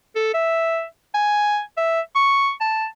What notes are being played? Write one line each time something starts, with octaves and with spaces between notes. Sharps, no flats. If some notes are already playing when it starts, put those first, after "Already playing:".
A4
E5
G#5
E5
C#6
A5